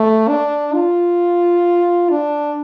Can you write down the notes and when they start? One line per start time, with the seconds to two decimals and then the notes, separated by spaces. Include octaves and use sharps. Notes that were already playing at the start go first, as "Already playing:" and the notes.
Already playing: A3
0.28 D4
0.73 F4
2.10 D4